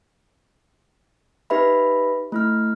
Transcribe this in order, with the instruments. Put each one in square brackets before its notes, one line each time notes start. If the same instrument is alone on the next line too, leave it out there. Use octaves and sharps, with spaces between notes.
[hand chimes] D#4 G4 B4 E5 B5
A3 E4 F6